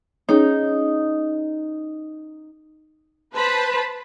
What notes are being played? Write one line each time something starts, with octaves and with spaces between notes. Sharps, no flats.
C#4 D#4 G#4 C#5
B4 C5 A5 B5